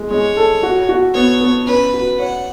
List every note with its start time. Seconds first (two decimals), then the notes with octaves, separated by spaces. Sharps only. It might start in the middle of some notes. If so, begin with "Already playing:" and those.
Already playing: G#3
0.11 G#3 C#5
0.37 A4
0.63 F#4
0.89 F#4
1.15 B3 C#5
1.41 B3
1.67 C#4 B4
1.94 F#4
2.19 C#5 F#5